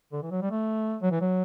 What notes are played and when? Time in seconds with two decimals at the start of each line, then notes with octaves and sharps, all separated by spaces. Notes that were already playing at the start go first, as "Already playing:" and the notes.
0.12 D3
0.22 E3
0.31 F#3
0.42 G3
0.51 A3
1.02 F#3
1.12 E3
1.21 F#3